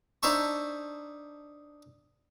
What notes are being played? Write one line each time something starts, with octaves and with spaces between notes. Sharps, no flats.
D4 D#4 C5 E5 A5 C#6